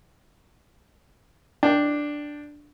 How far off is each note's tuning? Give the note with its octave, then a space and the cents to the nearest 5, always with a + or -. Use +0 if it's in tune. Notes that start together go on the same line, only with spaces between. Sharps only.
D4 +0 G5 +0